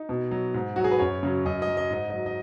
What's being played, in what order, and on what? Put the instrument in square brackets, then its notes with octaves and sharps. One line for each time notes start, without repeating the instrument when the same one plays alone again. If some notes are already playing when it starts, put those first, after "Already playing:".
Already playing: [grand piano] D#4
B2
F#3
G#2
F#3 F#4
G#4
B4
F#2 C#5
C#3 F#3
F#2 D#5
D#5
F#3
D#5
G#2 D#5
D#5
F#3
D#5